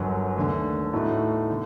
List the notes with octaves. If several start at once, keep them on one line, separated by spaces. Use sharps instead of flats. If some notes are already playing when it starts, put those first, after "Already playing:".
Already playing: G1 F#2 D3 F#3
D#2 D3 A3 D4
A2 A3 D#4 F#4
D3